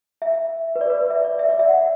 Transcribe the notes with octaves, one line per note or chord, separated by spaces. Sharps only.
E5
B4
D5
B4
D5
E5
D5
E5
D5
E5
F#5